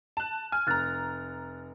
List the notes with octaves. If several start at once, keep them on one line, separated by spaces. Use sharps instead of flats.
A5 F#6
G#5 F6
F1 A#5 F6 F#6 A6